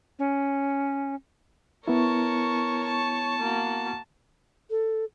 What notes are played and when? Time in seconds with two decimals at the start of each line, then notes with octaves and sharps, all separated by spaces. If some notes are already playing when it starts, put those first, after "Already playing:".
0.19 C#4
1.88 B3 E4 A#4 C#5 A5 C#6
2.86 A5
3.40 A#3 F#4
4.70 A4